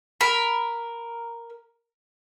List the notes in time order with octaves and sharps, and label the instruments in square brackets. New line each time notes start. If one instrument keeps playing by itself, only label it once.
[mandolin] A#4 B5